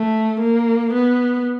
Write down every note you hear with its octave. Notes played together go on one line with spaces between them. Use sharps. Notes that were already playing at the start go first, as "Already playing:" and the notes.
Already playing: A3
A#3
B3